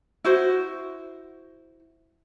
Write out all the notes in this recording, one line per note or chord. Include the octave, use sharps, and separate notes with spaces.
E4 F#4 C5